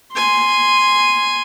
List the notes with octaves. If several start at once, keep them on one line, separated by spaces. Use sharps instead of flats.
G#5 C6